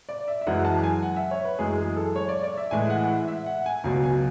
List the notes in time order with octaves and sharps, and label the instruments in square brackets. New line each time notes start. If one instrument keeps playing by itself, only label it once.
[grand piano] D5
E5
E5
F#2 E3 G#3 F#5
A5
G#5
F#5
E5
C#5
B4
F#2 E3 G#3 G#4
G#4
A4
C#5
D5
D5
E5
A2 E3 G#3 G#5
F#5
E5
E5
F#5
G#5
C#2 B2 F#3
G#5